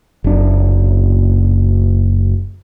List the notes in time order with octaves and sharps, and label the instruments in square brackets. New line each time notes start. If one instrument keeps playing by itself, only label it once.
[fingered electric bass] F#1 D4